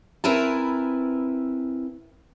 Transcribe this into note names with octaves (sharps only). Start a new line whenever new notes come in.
C4 E4 A#4 B4 G#5 A5